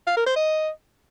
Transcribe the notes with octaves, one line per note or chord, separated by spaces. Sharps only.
F5
A#4
C5
D#5